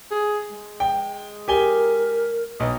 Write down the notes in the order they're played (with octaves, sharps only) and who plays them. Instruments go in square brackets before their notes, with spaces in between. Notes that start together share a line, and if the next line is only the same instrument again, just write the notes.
[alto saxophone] G#4
G#3
[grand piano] G5
[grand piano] G4 G#5 G7 [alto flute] A#4
[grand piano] B1 [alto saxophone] D#5